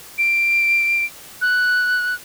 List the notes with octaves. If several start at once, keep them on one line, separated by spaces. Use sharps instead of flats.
D7
F#6